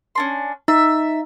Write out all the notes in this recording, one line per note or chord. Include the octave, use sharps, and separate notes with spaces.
C#4 D4 C6
D#4 E5